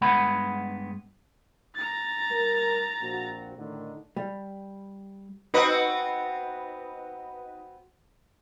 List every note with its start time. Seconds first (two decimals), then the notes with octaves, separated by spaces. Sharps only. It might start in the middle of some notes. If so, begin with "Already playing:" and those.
0.01 G2 G#3 B3 F#5 B5
1.75 A#5 A6
2.30 G3 A#4
3.01 A#1 C4 F#4
3.56 A2 D3 D#3
4.16 G3
5.54 B3 C4 D#4 F#4 B4 D#5